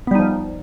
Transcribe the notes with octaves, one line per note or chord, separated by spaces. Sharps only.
F3 G3 B3 D#4